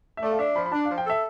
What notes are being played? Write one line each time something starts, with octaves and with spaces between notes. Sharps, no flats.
E5
A3 D5
F5
D4 E5
F3 B5
B5
D4 A5
F3 F5
G5
A4 E5